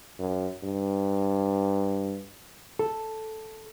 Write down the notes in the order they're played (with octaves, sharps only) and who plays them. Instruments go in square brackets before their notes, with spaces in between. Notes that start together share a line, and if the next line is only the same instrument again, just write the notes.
[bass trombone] F#2
G2
[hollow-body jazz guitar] A4